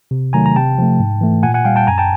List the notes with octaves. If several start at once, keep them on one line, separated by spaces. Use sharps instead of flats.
C3
D#3 F#3 A3 G#5 A#5
A#5
C3 G5 A5
F3 A3
G#2
E3 A3
A#2 F#5 G#5
F#5 G#5
G3 F5 G5
G5 A5
F#2 G#5 A#5
G5 A5